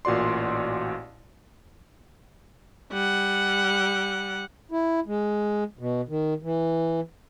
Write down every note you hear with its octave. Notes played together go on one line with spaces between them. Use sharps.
A1 A#2 F#4 D5 C6
G3 F#5
E4
G#3
B2
D#3
E3